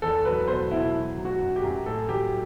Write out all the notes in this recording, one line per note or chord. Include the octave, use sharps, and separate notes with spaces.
E2 A4
F#3 B4
B2 C5
B2 E4
F#3
F#3
F#4
F#2
G4
F#2
A2 A4
F#3 G4